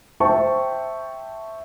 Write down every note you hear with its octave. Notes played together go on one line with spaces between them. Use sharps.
C5 E5 G5 A5 C#6